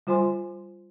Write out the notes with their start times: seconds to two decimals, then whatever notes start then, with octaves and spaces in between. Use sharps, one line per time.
0.07 G3 F4 C5 G#5 C6